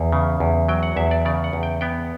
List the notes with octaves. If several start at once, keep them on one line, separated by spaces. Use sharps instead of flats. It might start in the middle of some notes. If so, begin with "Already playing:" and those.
Already playing: E2
C#3
E2
F#3 G5
F#5
E2 E5
D5
C#3 D5
F#5
E2
G5
B3 G5